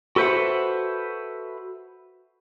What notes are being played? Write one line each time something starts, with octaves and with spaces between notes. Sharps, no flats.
F#4 A4 B4 C5 E5 F#5